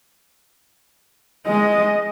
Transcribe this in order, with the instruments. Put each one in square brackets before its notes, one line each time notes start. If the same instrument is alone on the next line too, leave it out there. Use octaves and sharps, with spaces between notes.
[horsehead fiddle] G#3 D#5